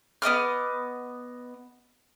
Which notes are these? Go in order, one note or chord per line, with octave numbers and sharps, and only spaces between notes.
B3 D#5 D6 F6